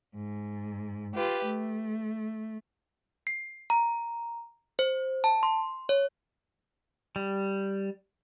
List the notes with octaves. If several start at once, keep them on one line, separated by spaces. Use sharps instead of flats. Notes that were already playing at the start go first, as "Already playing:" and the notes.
G#2
F4 G4 B4
A3
C7
A#5
C5
A5
C6
C#5
G3